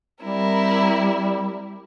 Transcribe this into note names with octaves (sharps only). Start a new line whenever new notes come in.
G3 C4 E4 A#4